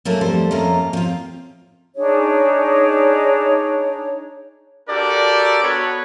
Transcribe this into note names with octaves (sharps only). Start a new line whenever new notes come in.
F#3 A3 A#3 C#4 E4
F2 G3 A4 C5
F2 A3 A#3 C#4 D#5 A#5
F3 C4 F4
D4 D#4 G#4 C#5
D4 F#4 G4 A4 A#4 D5
B3 F#4 A4 B4 C#5